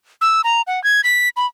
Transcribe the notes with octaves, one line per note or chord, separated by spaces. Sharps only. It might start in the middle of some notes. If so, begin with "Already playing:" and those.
E6
A#5
F#5
G#6
B6
B5